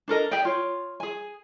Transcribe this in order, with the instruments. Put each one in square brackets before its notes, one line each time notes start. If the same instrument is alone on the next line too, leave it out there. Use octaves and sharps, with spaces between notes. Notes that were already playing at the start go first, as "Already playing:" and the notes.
[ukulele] D4 A4 A#4 D#5
G4 G#4 D5 G5
F4 C#5
G#4 G#5